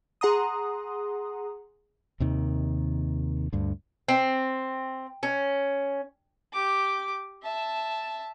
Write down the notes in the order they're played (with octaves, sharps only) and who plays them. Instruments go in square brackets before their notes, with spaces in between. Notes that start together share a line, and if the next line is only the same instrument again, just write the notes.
[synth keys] G#4 F#5 A#5 C6 D#6
[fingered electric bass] D#2 C3 D#3
D2 G2 D3
[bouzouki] C4
C#4
[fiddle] G4 D6
E5 A5